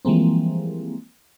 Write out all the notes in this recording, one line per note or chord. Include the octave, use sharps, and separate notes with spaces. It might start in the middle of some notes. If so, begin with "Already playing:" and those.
E3 F3 G3 G#3 A#3 C4